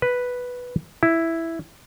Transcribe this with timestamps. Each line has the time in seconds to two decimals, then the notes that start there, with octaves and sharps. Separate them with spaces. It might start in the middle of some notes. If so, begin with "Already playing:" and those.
0.02 B4
1.03 E4